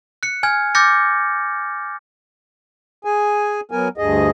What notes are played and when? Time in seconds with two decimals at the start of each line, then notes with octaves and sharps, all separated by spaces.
0.23 F#6 C#7
0.43 G#5 F6 G#6
0.75 D6 F6 G6 A6 A#6 C#7
3.05 G#4 G#5
3.71 F#3 B3 A#4 G#5
3.98 D2 G2 G#4 D#5